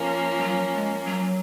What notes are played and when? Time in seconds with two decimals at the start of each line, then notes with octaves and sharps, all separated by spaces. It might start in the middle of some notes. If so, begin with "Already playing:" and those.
Already playing: F3 A#3 C#4
0.38 G#3
0.42 F#3
0.74 G#3
1.05 F#3